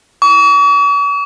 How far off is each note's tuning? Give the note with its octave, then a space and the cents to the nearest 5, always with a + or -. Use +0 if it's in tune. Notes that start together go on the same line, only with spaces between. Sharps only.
C#6 +45